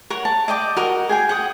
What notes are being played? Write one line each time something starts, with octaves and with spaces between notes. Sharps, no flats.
A#4 C#5 F#5
A5
D5 D#5 G5 D6
F#4 A#4 D#5
G#4 G5 G#5
F#5 G5 D#6